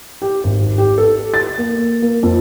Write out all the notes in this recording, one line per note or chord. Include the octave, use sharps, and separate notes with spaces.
G4
G#1
G4
A4
A6
A#3
A#3
F2